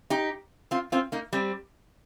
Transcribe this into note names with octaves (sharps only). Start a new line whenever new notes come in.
D#4 G4
C4 F4
C4 F4
A#3 D#4
G3 C4